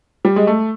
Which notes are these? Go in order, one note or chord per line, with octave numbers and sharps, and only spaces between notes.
G3
G#3
A3